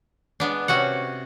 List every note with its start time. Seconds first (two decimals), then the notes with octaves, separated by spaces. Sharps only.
0.40 G#3 B3 D4
0.68 C3 C#4 F#4 F#5